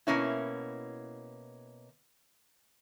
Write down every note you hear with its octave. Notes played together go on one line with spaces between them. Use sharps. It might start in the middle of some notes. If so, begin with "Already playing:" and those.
B2 A#3 C#4 E4